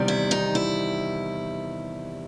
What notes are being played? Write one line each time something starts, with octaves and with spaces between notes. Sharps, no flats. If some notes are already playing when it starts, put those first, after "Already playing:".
Already playing: E2 C3 D#3 G3
E4
D#4
E4